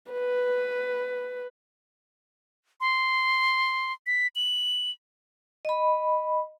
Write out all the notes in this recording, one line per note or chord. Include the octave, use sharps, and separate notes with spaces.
B4
C6
B6
F#7
D#5 B5